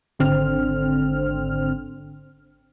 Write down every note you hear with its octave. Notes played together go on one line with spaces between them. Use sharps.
G#1 D3 C4 F6